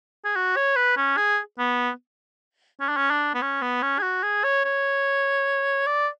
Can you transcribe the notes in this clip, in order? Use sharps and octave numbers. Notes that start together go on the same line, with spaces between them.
G#4
F#4
C#5
B4
C#4
G#4
B3
C#4
D4
C#4
D4
B3
C#4
B3
C#4
G#4
F#4
G#4
C#5
C#5
D5